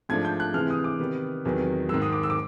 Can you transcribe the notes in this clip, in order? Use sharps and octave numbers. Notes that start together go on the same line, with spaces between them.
G#2 F3 A3 D4 G#6
G6
F#6
C3 E3 G#3 F6
D#6
D6
C3 D#3 G3 B3
E2 C3 D#3 F#3 B3
G#2 D#3 G#3 E6
D#6
D6
E6
D6